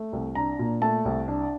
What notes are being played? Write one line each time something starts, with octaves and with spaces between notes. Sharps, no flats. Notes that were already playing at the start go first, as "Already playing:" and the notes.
Already playing: A3
C2
D4 A#5
A#2
A3 A5
C2
D4